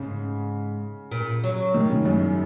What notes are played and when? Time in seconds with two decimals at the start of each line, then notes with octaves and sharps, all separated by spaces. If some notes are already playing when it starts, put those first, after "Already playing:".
Already playing: G#2 C#3
1.11 A#2
1.44 F#3
1.74 D#3
1.90 C#3
2.05 F#2